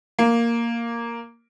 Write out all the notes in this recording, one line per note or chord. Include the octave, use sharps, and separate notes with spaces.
A#3